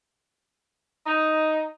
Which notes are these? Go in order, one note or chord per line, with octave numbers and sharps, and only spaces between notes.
D#4